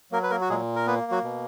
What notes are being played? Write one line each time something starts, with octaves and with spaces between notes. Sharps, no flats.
F#3 A#3 A#4
B4
A#3 A#4
F#4
A#2 G#3 G#4
A#4
A#3 B3 B4
F#3 F#4
B2